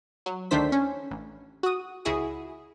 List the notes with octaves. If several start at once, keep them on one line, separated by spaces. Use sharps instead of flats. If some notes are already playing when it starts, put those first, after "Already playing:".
F#3
D2 D#3 A3 D4 C5 B6
C#4
A1
F#4 D#6
C#2 E4 F#4 G#4 D#6